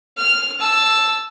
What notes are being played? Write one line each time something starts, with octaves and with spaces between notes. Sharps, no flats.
F6
A5 E6